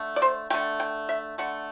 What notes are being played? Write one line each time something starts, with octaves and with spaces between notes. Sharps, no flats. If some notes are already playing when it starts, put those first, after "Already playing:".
Already playing: D3 A3
D5
C5
D3 A3 G5
G5
E5
D3 A3 F#5